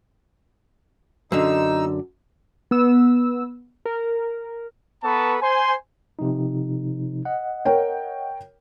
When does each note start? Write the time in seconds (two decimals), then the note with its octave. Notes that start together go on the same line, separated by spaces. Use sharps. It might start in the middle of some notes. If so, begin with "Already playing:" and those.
1.32 F#2 D3 D#4 E6
2.71 B3 E6
3.85 A#4
5.04 B3 A4 B4 A5 A#5 C#6
5.42 C5 G#5 C6
6.19 C3 F3 D#4
7.25 D#5 F#5
7.65 A#4 C#5 G5